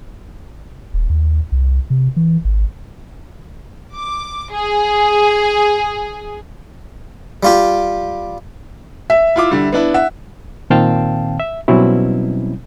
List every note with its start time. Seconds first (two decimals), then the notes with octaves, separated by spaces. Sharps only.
0.94 D#1
1.10 D#2
1.52 C2
1.90 C3
2.16 E3
2.45 G#1
3.95 D6
4.52 G#4
7.43 G3 F4 G4
9.10 E5
9.36 E4 F4 D6
9.51 D3 G3
9.72 B3 D4 E4
9.94 E5 F#5
10.70 A#2 D#3 C4 F5 G5 A5
11.40 E5
11.68 B2 F#3 G3 C4 C#4 E4